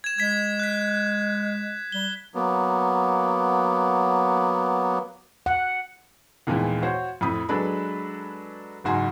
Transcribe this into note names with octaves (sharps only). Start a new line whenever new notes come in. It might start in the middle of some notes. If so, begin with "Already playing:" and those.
G#6 E7
G#3 G#6 B6
F#6 B6
G3 G7
F#3 A#3 B3
F#5
D#2 A#2 E3 F3 G#3 B3
F#4 C5 C#5
F2 A2 C4 B5 D#6
F#3 G#3 D4 A4 B4 B5
F#1 G#2 F#4 G#5 C6